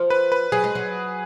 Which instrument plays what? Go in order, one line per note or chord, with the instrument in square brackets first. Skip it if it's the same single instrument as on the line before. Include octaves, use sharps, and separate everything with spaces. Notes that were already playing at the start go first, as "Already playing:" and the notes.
Already playing: [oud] F3
[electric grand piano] B4
B4
[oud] F#3 [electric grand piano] G#4
[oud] G#3
F#3